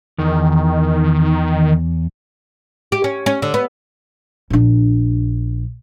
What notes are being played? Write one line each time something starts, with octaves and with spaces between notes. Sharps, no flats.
E2 D#3
G4
C#4
C#4
D3
B3
A#1 D4